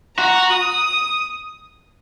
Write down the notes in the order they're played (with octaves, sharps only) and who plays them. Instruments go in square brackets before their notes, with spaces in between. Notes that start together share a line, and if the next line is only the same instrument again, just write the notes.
[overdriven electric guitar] F#4 [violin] A#5
[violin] D#6